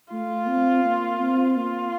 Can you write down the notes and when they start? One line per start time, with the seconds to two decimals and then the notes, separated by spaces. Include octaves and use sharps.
0.12 A3 F4
0.48 C4
0.85 A#3
1.20 C4
1.57 A#3 F4